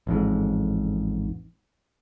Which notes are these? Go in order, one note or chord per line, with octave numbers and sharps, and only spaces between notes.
A1 F2 G#2